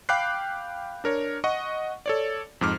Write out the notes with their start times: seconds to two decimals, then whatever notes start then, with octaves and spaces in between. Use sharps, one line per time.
0.09 F5 G5 B5 D6 F#6 C7
1.04 D4 A#4 C#5
1.44 D#5 F#5 C#6
2.06 A4 C#5 D5
2.61 F2 G#2 D6 F6